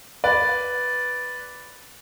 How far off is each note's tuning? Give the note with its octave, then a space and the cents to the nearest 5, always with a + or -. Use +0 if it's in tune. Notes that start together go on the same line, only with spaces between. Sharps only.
B4 +0 D5 -10